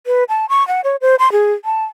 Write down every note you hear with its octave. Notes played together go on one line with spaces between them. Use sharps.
B4
A5
C#6
F#5
C#5
C5
C6
G#4
A5